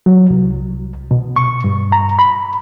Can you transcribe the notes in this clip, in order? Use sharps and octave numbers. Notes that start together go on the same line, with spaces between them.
F#3
C2
B2
C#6
G2
A#5
B5